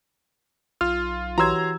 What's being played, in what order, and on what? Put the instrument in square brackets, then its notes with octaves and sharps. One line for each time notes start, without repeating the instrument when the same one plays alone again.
[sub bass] B1 [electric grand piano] F4 [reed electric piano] F6
[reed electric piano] E3 E6 [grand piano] F#4 G4 C#5 [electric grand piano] A#5 C6 G#6